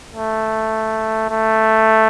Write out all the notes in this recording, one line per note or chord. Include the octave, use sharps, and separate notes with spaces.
A3
A3